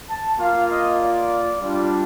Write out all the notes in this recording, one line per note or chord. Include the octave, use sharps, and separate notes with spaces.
A5
A#3 F4 F5
D#5
D5
G3 D4 F4